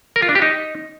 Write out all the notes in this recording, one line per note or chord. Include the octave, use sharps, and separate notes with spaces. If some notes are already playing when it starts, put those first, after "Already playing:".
A#4
F4
D4
G4
D#4